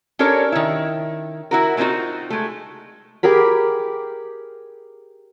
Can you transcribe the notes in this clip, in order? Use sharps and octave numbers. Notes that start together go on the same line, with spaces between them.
C#4 D4 G4 A4 A#4 C#5
D#3 E4
E4 F#4 A#4
G#3 A#3 C4 D#4 F4 F#4
G#3 A3
G4 G#4 A#4 B5